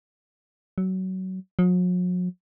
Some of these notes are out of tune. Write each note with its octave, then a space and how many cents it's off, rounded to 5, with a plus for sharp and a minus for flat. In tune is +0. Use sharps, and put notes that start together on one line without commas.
F#3 +20
F#3 -45